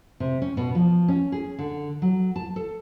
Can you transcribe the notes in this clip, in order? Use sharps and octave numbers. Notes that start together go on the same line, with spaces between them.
C3
C#4
B2
F3
C#4
G#4
D3
F#3
A5
A4